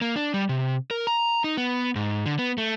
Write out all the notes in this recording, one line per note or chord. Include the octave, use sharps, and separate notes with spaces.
A#3
D4
G3
C3
A#4
A#5
D#4
B3
G#2
D3
B3
A3